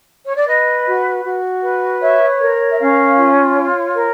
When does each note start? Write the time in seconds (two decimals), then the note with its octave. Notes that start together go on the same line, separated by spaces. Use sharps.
0.24 C#5
0.35 D5
0.46 B4 D#5
0.86 F#4
1.24 F#4
1.62 B4
2.01 C#5 E5
2.40 A#4
2.71 E5
2.79 C#4 F5
3.17 F4
3.56 C#5
3.95 A#4